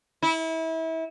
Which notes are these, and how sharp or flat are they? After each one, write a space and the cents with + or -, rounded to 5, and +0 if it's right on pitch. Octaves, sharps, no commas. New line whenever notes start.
E4 -30